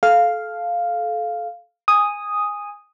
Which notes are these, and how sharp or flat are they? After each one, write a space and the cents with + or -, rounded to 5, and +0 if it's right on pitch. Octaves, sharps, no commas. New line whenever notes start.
A4 -25 F5 +0
G#5 -15 D#6 +0